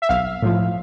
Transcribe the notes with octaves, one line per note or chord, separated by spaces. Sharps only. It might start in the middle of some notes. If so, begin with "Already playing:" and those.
E5
B1 F5
A2 F3